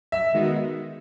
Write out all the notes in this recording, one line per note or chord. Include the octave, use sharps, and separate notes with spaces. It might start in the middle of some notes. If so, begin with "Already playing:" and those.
E5
D#3 G#3 B3 D#4 F#4